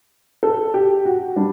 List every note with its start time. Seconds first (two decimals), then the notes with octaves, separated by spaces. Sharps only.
0.43 A4
0.74 G4
1.05 F#4
1.36 G3 D4